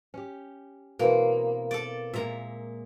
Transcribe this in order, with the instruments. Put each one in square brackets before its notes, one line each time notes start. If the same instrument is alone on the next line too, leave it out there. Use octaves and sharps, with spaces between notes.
[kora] C#4 G4
[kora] B2 E3 C4 [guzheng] A#3
[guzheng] A4 D5
[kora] A#2 G#3 A#3 [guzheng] E5 A#5